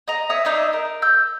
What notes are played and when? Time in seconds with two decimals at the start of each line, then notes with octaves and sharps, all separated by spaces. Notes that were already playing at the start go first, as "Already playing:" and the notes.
0.08 D#5 A#5
0.29 C#5 D#5 E5 D#6
0.45 D4 D#4 D#5 E5
0.73 A#4 D#5
1.02 E6 G6